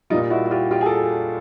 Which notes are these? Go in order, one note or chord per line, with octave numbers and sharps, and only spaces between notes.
A#2 G3 D#4 F4
E4 F#4
F#4
F4 G4
F4 G4
G#4
G4 A4